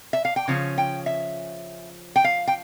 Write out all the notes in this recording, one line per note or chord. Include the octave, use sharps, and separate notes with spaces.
E5
F5
G5
C#3 F3 C#4
G5
E5
G5
F5
G5